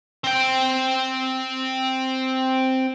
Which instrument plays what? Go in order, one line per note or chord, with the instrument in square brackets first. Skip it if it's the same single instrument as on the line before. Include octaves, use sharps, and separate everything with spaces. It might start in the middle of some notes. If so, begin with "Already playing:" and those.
[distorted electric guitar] C4 G5